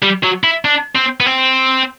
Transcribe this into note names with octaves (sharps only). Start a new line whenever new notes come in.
G3
F#3
E4
D4
C4
B3
C4